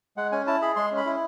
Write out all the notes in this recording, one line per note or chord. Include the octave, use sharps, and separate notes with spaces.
G#3 F#5
C#4 G#5
E4 A5
G#4 B5
G#3 C6
C#4
B5
E4